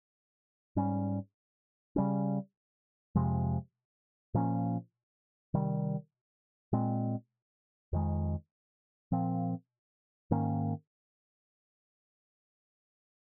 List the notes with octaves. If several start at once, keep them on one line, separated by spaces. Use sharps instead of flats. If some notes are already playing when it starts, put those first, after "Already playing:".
G#2 G3 C#4
C#3 G3 C#4
F2 C3 F3 G#3
A#2 F3 A#3 C#4
C3 D#3 G3
A#2 G#3 C4
F2 D#3 G#3
A#2 F3 C4
G#2 D#3 A#3 C#4